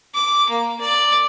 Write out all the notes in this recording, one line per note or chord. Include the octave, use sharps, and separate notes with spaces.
D6
A#3
D5